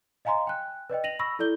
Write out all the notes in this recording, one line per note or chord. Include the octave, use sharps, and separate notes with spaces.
D#5 F5 G#5 A#5 C6
G5 F#6
B4 D5 D#5 G5
A#6 D#7 F7 F#7
B5 C#6 E6 A#6
E4 A4 D5 G6 G7